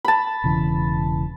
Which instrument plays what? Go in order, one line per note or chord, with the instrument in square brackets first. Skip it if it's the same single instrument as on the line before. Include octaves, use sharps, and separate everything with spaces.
[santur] A5 B5
[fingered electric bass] E1 C#3 E3